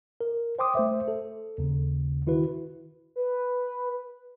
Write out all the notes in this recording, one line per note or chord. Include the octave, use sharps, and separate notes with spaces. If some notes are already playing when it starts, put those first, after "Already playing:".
A#4
C5 G5 C6 D6 D#6
A3 C5 E5
A4
D#2 C#3
D#3 E4 F#4 B4
B4